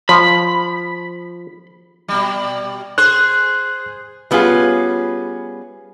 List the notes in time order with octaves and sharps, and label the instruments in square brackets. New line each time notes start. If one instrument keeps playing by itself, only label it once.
[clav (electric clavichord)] F3 [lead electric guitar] B5
[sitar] B2 G3
[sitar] G#4 C5 [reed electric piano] F#6
[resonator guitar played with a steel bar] G3 B3 C#4 F4 G#4